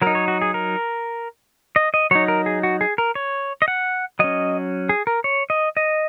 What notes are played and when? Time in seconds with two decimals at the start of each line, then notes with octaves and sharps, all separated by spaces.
0.02 F#3 A#4
0.07 D#4
0.15 C#5
0.28 F#4
0.42 G#4
0.54 A#4
1.76 D#5
1.94 D#5
2.11 F#3 D#4 C#5
2.28 A#4
2.46 G#4
2.63 F#4
2.81 G#4
2.98 A#4
3.15 C#5
3.62 D#5
3.68 F#5
4.19 F#3 C#4 D#5
4.89 G#4
5.07 A#4
5.24 C#5
5.50 D#5
5.77 D#5